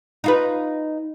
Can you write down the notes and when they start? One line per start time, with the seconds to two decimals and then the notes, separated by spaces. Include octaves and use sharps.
0.24 D#4 F4 B4